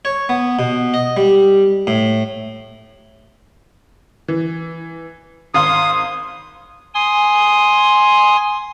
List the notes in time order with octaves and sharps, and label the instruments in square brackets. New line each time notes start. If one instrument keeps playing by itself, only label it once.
[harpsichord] C#5
B3
B2
D#5
G3
A2
[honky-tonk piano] E3
[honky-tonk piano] G#1 F5 C6 [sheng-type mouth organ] D#6
[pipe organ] G#5 C6 D#6